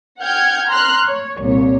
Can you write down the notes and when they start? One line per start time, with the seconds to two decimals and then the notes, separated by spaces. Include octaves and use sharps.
0.20 F#5 G5 F6 G6 G#6
0.68 A#5 C6 F6 F#6
1.06 C#5
1.41 C2 A#2 C#5